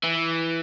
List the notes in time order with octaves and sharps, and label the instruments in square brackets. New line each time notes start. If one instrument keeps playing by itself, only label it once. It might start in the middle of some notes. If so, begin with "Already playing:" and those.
[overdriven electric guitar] E3